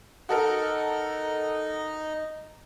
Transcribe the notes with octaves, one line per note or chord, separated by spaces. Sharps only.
D#4 F#4 A4 A#4 D#5